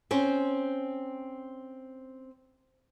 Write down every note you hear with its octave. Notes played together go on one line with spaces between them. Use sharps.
C4 C#4 C5